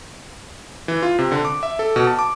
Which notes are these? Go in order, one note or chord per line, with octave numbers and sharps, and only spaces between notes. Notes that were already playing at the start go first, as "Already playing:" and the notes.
E3
F4
C3
D3
D6
E5
A4
B2
A5
D6